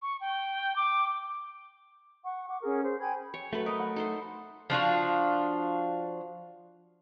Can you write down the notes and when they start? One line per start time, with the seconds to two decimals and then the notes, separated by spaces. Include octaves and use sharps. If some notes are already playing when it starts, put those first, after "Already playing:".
0.02 C#6
0.21 G5
0.76 D6
2.25 F#5 C#6
2.49 F#5 D6
2.63 C#4 G#4 A#4
2.83 G#4 C5
3.00 G5 G#5 B5 G#6
3.34 C#5
3.53 F#3 A3 A4 B4
3.66 A#4 D#5 B5
3.80 F#5
3.96 D#4 A4 C5
4.70 F3 D4 F4 F#4